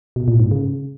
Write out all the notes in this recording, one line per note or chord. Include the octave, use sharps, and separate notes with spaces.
B2
A#2
G#2
C#3